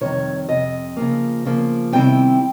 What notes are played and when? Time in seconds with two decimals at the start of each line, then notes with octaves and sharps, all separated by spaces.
0.01 F2 C3 D#3 G3 C#5
0.49 F2 C3 D#5
0.97 C#3 F3 A#3
1.45 C#3 F3 A#3
1.92 C3 D#3 G3 C4 E4 G5